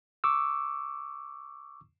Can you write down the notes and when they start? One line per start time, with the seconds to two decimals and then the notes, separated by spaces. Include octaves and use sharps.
0.24 C#6 D6 E6